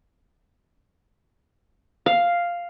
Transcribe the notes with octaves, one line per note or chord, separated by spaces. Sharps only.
F5